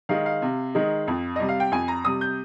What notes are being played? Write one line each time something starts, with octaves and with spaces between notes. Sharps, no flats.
D#3 G#3 D#4 F5
F5
C3
D#3 G#3 D#4
F2
C3 G3 D#5
F5
G5
F2 G#5
A#5
C3 G3 D#6
G6